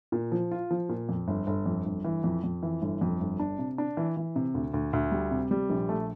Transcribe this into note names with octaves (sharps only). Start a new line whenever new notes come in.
A#2
F3
F4
F3
A#2
F2
G1
G1
F2
G1
E3
F2
F2
E3
G1
F2
G1
D4
C3
D4
E3
E3
C3
D2
D2
D2
G3
C3
G3
A#1
A3